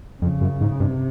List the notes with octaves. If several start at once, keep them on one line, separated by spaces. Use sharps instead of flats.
F2 C#3
F#2
G#2
G2 C3